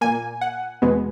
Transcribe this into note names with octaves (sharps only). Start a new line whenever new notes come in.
A#2 A#3 G#5
F#5
E2 B2 G#3 B3